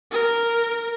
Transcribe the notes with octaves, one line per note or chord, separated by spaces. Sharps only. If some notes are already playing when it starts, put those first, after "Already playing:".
A#4